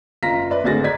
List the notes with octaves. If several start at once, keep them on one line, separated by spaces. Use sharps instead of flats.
F#1 F4 A#5 A#6 B6
B4 D5 E5
G#1 D2 F#4 G#4 A6 A#6
D5 D#5 A#5 G#6 B6